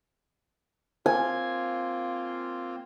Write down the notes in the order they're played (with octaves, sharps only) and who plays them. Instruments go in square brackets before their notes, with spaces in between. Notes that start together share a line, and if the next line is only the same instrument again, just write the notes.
[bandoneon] A#3 C4 F4 [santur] G#5